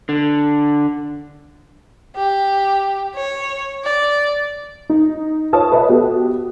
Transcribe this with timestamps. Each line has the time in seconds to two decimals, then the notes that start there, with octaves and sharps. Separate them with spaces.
0.09 D3
2.16 G4
3.15 C#5
3.84 D5
4.89 D#4
5.53 F4 B4 C#5 A5 D#6
5.72 B4 D#5 E5
5.89 B3 F#4 G4 A4